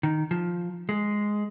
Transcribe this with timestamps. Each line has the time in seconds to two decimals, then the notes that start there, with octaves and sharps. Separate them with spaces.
0.03 D#3
0.31 F3
0.89 G#3